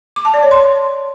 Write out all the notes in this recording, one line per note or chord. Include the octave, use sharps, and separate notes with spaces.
D6
A5
D5
C#5
C6